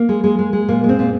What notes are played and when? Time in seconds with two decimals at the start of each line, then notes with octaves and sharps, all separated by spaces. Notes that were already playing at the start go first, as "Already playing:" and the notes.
Already playing: A#3
0.09 G#3
0.24 G#3
0.39 G#3
0.53 G#3
0.68 A#2 A#3
0.84 G#3
0.89 C4
0.99 A#2